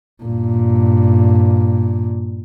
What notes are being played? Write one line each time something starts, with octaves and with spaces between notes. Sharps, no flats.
G2 A#2